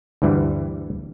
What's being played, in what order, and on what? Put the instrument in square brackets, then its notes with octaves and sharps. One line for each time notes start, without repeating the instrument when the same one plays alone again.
[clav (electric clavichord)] D2 G2 E3 G3